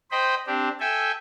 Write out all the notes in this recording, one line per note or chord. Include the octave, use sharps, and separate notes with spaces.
C5 D#5 G5 B5
C4 D4 G4
A4 E5 G5 G#5